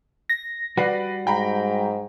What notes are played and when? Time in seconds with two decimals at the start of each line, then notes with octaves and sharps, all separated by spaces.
0.29 A#6
0.77 G3 F#4 B4 D5 F#5 C7
1.27 G#2 G5 A#5 B5